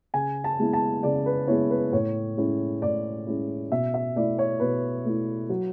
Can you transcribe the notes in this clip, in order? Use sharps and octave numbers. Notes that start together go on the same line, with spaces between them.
C#3 G#5
A5
G#3 B3 E4
A5
C#3 D5
B4
G#3 B3 E4 C#5
B4
A2 C#5
G#3 C#4 E4
A2 D5
G#3 C#4 E4
B2 E5
E5
A3 E4 D5
C#5
B2 B4
A3 E4
F#3